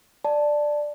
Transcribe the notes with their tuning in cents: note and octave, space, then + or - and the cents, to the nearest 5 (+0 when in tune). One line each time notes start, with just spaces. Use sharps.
D5 +5 A5 +0